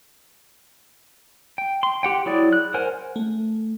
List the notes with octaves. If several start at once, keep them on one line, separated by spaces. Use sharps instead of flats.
G5
C6
G4 F#5 G5
F#3 E4 G#4 D5
F#6
A#4 C5 F#5 G#5
A3